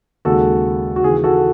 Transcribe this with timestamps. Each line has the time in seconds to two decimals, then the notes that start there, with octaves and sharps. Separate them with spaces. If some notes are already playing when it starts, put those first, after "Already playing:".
0.25 D#2 C#3 G#3 F#4 A4
0.96 F#4
1.03 D#2 C#3 E3 G#4
1.17 G#4
1.24 F#4 A4